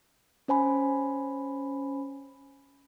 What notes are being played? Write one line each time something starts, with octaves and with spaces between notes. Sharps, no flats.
C#4 C5 G#5 B5